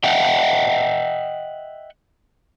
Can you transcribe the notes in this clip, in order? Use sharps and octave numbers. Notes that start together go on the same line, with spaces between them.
D#5 E5 F#5 G5